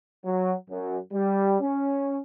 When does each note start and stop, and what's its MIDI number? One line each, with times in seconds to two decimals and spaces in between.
0.25 0.53 54
0.69 0.97 42
1.13 1.57 55
1.61 2.19 61